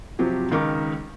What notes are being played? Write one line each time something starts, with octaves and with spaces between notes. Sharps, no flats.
C3 F3 F#3 G4
C#2 D#3 A#4 D#5 D6